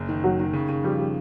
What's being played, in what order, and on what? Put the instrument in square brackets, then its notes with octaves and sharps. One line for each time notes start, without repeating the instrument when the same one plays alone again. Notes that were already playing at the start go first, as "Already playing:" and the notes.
Already playing: [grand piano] F#1
D#3
[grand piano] F#1 [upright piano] F#3
[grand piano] D#3
C#3
C#3
[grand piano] F3 [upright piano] G3
[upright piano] G3